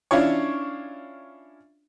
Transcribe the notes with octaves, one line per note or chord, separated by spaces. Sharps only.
C#4 D4 E4 F4 C#5